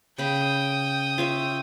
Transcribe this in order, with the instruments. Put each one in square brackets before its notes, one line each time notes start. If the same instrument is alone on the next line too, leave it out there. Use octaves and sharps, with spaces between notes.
[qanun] C#3 B5 [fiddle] G5 D#6
[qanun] F4 C#5 E5